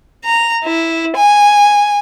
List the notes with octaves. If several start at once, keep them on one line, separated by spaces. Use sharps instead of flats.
A#5
E4
G#5